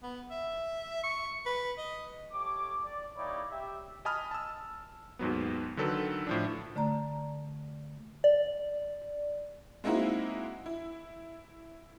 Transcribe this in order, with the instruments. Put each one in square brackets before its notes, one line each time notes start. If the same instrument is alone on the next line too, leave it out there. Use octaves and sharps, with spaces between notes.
[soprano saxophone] B3
E5
C#6
B4
D#5
[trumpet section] A3 G4 C#5 D6
D5
G3 A#3 D#4 E4 C#5 D5
G4 E5
[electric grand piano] D#5 G#5 A5 B5 D#6 F6
A5 E6
D#2 G#2 F#3 B3
D3 D#3 F#3 A4 B4
A2 F3 D4
[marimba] D3 A3 D5 A#5
[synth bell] D5
[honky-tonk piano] G#3 A#3 C4 D#4 E4 F#4
E4